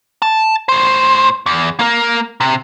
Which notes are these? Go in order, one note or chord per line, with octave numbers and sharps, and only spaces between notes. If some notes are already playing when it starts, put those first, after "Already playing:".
A5
A2 C5
E2
A#3 A#4
C3